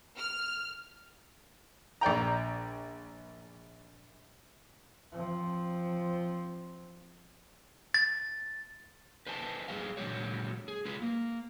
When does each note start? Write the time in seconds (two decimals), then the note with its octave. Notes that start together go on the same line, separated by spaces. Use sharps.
0.19 F6
2.01 A#1 D5 G5 A#5
5.12 F3 C4
7.94 A6
9.27 B4 C5 D#5 G#5 A5
9.68 G3 G#4 C5 D#5 F5
9.97 A#2 D3 F#3 G#3 G4 C#5
10.68 G#4
10.85 G#3 F4 G#4 B4
11.02 A#3